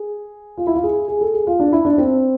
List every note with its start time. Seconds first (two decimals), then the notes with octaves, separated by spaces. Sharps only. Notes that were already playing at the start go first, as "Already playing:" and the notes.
Already playing: G#4
0.57 F4
0.67 E4
0.75 F4
0.83 G#4
1.08 G#4
1.21 A4
1.34 G#4
1.47 F4
1.59 D4
1.72 E4
1.85 D4
1.98 C4